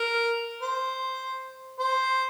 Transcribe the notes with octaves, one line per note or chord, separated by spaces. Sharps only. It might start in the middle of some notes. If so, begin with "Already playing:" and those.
Already playing: A#4
C5
C5